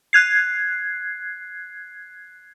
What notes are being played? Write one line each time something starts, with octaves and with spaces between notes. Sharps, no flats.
F#6 G#6 C7